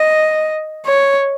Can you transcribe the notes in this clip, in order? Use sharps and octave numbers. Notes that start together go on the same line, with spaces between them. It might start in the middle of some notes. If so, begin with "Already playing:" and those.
Already playing: D#5
C#5